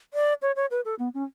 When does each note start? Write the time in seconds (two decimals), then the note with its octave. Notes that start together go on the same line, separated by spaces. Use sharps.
0.14 D5
0.42 C#5
0.56 C#5
0.71 B4
0.85 A4
0.99 B3
1.14 C#4